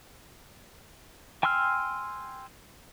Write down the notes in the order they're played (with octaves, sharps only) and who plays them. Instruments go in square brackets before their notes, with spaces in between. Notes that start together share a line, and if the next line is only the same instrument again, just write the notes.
[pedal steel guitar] G5 G#5 C6 E6 F6